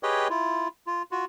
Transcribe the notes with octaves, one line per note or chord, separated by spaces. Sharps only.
G4 G#4 B4 C#5 D#5 G5
E4 F4
F4
F4 F#4